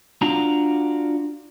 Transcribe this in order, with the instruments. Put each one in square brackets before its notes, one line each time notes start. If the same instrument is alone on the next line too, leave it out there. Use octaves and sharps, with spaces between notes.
[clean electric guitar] D4 F4 F#4 A#5